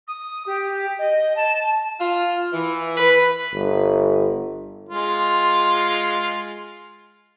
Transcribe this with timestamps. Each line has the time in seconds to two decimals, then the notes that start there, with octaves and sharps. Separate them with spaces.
0.07 D#6
0.46 G4
0.98 D#5
1.36 A5
2.00 F4
2.53 E3
2.97 B4
3.53 G1
4.89 G#3 F4